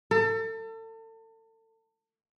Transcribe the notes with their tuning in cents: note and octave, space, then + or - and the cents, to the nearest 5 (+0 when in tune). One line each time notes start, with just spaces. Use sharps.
A4 +35